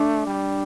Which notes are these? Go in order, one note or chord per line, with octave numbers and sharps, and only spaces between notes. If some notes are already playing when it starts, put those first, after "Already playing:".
Already playing: A3 D4
G3